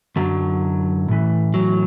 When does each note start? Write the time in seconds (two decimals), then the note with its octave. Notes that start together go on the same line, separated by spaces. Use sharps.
0.16 F#2 D3 F#3
1.08 A2 E3
1.54 F#3